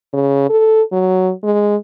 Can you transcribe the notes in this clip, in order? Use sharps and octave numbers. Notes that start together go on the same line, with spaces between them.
C#3
A4
F#3
G#3